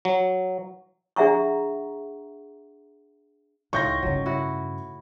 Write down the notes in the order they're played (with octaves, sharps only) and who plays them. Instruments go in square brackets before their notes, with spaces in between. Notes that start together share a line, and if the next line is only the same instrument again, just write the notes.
[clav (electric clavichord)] F#3
[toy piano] D4 G#4 E5 F#5 A#5 C#6
[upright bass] C#2 [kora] A2 D#3 F4 [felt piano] C#6 G6 A#6
[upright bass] G2 C#3 [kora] F#3
[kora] E4 F#4